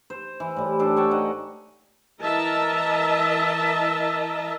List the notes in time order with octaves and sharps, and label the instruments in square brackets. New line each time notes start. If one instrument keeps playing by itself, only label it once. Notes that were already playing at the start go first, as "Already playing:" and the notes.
[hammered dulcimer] C5
E3
A2 G3
D4 G4 A4 C5
C#5 F#5 G5 A5
D#4 D#5 F#5
[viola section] E3 A#4 D#5 E5 A5